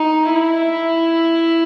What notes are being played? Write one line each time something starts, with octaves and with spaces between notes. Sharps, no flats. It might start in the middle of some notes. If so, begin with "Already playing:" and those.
Already playing: D#4
E4